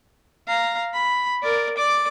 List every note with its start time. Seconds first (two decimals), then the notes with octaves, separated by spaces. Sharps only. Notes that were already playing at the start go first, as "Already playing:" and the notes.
0.48 F5 A#5
0.93 B5
1.42 A#4 D5
1.77 D5 D6